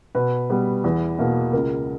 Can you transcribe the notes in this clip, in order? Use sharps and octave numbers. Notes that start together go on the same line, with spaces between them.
B2 B4
G3 B3
E2
B2 A#3
C#2 A#4